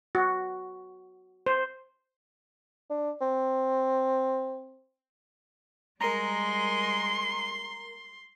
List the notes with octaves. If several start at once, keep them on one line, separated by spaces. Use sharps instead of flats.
F#4
C5
D4
C4
G3 G#3 A#4 A#5 C6